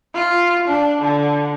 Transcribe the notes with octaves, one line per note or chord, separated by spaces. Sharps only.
F4
D4
D3